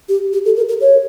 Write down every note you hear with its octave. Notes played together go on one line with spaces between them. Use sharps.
G4
G4
A4
A#4
A#4
C#5